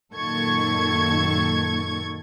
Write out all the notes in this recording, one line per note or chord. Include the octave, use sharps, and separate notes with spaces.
F#2 A#2 D#3 A4 C#6 G#6